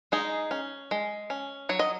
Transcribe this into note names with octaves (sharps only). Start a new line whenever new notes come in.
G#3 D#4 G#4
C#4
G#3
C#4
F#3 C#5
D#5